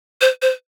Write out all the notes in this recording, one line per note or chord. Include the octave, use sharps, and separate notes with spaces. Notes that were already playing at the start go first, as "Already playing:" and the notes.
C5
C5